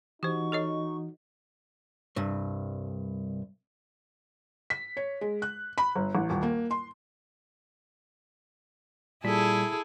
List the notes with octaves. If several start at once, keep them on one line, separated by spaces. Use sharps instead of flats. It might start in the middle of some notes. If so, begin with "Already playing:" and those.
E3 D#4 F#4 G4 C5 C#6
A4 C#5 D#5
C2 G2
B6
C#5
G#3
F#6
B5
G1
A1
D#1
A#3
C6
A#2 G3 E4 G#4 A4 B6